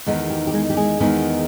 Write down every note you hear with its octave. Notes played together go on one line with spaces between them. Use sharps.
E2 D#3 G#3 B3 D#4
G4
G4
G#3 G#4
G4
G#3 G#4
E2 D#3 G#3 B3 D#4